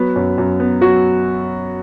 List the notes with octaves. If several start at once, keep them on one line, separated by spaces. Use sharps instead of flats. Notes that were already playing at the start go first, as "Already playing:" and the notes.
Already playing: F#3 B3 B4
F#2
F#2
B3
F#3 F#4